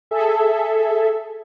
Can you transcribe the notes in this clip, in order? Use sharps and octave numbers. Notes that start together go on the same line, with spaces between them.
G#4 A4 E5